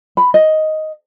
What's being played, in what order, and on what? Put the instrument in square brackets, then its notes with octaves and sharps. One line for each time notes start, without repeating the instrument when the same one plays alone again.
[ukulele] B5
D#5